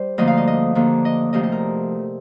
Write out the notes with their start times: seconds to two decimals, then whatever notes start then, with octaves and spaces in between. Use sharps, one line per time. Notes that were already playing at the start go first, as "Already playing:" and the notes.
Already playing: G3 C5
0.18 D2 D3 F3 A#3 D#5
0.27 F5
0.37 D#5
0.48 D#5
0.75 D#2 D3 F3 A#3
1.05 D#5
1.33 D2 C3 F3 A3 D#5
1.43 D#5
1.52 A#4